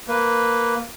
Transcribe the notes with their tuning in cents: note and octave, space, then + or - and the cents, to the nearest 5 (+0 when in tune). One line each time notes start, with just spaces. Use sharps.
A#3 +0 B4 +0